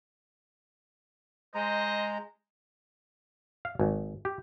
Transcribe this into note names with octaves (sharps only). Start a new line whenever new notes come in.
G#3 C5 D#5 A#5
F5
G#1
G4